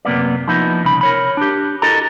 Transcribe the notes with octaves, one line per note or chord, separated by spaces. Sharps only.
F#2 C3 A#3 B3 D5
F3 A#3 B3 D#4 E4
C2 C#3 B5
A#4 C#5 B5
D4 G4
E4 F#4 A4 A#4 D#5 A#5